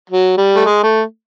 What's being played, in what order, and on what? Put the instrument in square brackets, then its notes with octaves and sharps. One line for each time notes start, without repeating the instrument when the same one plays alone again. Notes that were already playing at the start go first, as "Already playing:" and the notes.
[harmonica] F#3
G3
A3
G#3
A3